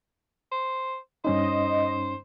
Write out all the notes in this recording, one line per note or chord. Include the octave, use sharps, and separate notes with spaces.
C5
G2 C#4 D#4 C5 D#5